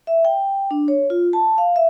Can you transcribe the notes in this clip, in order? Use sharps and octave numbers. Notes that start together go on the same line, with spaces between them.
E5
G5
D4
C#5
F4
A5
F5
E5